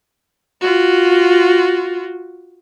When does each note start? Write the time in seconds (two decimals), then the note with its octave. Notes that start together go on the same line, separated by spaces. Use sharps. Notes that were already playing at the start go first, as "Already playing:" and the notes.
0.61 F4 F#4